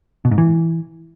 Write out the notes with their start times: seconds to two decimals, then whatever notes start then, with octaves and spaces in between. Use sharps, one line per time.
0.25 B2
0.31 G#2
0.38 E3